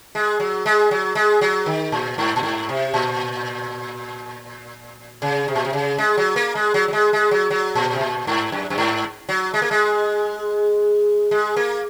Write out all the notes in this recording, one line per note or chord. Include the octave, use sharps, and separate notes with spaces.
G#3
F#3
G#3
F#3
G#3
F#3
D#3
A#2
G#2
A#2
G#2
C3
A#2
C#3
C3
A#2
C3
C#3
G#3
F#3
A#3
G#3
F#3
F#3
G#3
G#3
F#3
F#3
A#2
C3
A#2
G#2
F#2
F#2
G#2
F#3
G#3
A#3
G#3
G#3
A#3